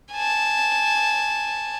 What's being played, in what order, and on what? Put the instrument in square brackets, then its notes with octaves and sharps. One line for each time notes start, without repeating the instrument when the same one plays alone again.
[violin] G#5 A5